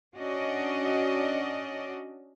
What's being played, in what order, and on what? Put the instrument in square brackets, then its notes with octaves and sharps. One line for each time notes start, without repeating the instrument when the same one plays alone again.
[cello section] C#4 D4 F#4 D5 D#5